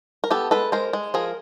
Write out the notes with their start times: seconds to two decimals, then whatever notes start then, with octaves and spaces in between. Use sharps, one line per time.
0.24 A#4
0.30 B3 G4 A4
0.51 G#3 A4 B4
0.72 G#3 A#4 C5
0.93 G#3
1.14 F3 G#4 A#4